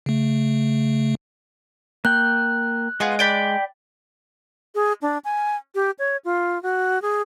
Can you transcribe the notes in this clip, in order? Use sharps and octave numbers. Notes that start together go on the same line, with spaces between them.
C#3 A3
A#3 G5 F#6
G#3 B3 F4 G#4
D5 G5 B5
G#4
D4
G#5
G4
C#5
F4
F#4
G#4